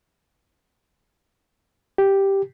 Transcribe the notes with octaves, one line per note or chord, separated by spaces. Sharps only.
G4